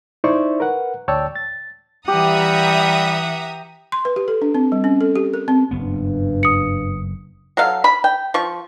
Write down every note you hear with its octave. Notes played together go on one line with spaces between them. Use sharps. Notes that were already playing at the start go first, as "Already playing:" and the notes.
D#4 E4 C5 D5 E5 C#6
A#4 B4 F#5
D2 C#5 D5 G5 A5 E6
A6
E3 G3 G4 E5 F#5 A#5 D#6
C6
B4
G4
A4
D4
C4
G3
C#4
A4
G4
A#4
C4
F#1 G2 B3
D#6 C#7
F#3 A4 F5
B5
G5
F3 C#6